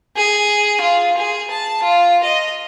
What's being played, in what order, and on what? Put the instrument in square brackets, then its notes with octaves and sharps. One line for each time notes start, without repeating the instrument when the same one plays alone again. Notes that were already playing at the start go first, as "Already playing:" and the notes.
[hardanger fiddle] G#4
F4
G#4
A5
F4
D#5